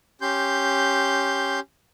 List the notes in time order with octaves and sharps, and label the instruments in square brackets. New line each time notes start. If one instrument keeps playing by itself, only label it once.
[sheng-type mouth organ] C#4 G4 C6 G6